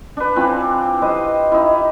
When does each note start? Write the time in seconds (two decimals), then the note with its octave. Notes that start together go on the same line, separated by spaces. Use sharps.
0.17 D4 B4
0.36 E3 C4 F4
1.02 G4 B4 C5 D#5
1.52 D#4 E4